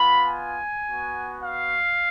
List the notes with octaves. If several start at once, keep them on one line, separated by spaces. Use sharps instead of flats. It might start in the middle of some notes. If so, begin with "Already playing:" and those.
Already playing: B3 F4 B5
G#5
B3 F#4
F5